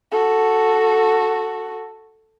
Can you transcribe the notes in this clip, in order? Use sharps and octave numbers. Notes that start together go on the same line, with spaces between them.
F#4 A4